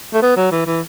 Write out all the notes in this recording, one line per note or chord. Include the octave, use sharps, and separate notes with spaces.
A3
B3
F#3
E3
E3